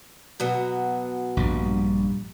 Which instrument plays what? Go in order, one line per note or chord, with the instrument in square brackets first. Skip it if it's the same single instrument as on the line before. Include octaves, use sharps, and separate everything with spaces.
[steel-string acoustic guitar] B2 F#3 B3
[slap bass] A#1 G2 G3